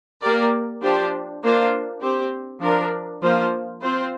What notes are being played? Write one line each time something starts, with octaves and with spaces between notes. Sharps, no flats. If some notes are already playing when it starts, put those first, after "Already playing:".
A#3 G4 A#4 D5
F3 D4 G4 C5
A#3 D4 F4 C5
C4 G4 C5
F3 D4 A#4
F3 A#3 F4 C5
C4 F4 C5